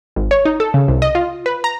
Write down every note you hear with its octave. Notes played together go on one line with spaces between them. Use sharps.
G#1
C#5
D#4
A4
C#3
C2
D#5
F4
B4
A#5